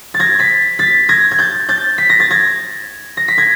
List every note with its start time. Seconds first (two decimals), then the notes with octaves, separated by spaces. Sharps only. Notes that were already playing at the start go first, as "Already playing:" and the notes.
0.14 A6
0.19 G#6 A#6
0.39 A6 B6
0.79 A6 B6
1.09 G#6 A#6
1.31 G#6
1.39 G6 A6
1.69 G6 A6
1.98 B6
2.10 A#6
2.20 A6
2.30 G#6 A#6
3.17 A#6
3.28 B6
3.38 G#6 A#6